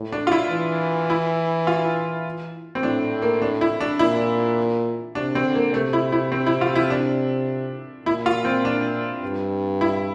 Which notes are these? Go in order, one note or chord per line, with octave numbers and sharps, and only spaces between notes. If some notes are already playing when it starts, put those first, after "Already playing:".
Already playing: A2
D4
F4
E4
E3
E4
F4
C4
A2 D4
A#3
D4
E4
D4
A#2 E4
C3 D4
C4
D3
A#3
C3 A3
E4
E4
C4
E4
F4
E4
D4
A#2 E4
F4
C4
D4
G2
E4